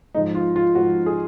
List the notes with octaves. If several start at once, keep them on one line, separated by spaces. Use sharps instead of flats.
G#2 F3 D#4
F4
F4
G#2 F3 F#4
G#4